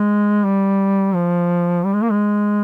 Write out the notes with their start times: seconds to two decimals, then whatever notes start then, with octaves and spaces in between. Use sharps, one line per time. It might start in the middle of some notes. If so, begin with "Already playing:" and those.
Already playing: G#3
0.44 G3
1.14 F3
1.85 G3
1.94 G#3
2.02 A#3
2.11 G#3